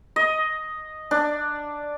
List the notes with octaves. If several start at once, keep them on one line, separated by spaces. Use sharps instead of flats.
D#5
D4